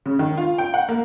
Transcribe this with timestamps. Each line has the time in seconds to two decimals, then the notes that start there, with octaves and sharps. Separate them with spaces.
0.06 C#3
0.19 D#3
0.37 F4
0.58 G5
0.74 F#5
0.89 A#3